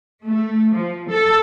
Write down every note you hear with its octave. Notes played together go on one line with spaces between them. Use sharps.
A3
F3
A4